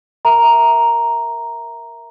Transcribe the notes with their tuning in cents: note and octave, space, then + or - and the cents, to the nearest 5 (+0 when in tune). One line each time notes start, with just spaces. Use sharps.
A#4 +0 E5 +0 A#5 +0